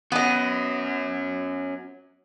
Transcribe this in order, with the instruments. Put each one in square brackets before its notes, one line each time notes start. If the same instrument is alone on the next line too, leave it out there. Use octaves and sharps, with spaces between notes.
[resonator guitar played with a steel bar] B3 D#5 [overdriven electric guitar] C#4 F#4